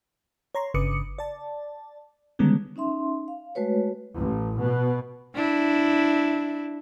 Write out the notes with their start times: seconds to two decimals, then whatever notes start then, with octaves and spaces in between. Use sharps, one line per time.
0.55 C#5 A#5 C6
0.74 G1 C#3 B4 D6 D#6 C#7
1.18 D5 A5
2.39 D3 D#3 G3 G#3 B3 C#4
2.76 C#4 D#4 E5 C6
3.28 F5
3.55 G#3 A3 F#4 B4 C#5
4.16 A1
4.61 B2
5.35 D4 E4